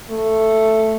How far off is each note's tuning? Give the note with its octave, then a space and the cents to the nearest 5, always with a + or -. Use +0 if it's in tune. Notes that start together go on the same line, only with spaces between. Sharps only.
A3 +5